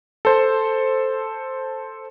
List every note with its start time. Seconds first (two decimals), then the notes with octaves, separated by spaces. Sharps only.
0.25 A4 C5